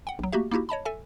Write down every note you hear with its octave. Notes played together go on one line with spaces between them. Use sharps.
F#5 G5
A#1 F#3
A3 A#3 F#4 G4 E5
A#3 D#4 E4 F#4 G4
C#5 D#5 A5 B5
A4 E5 G#5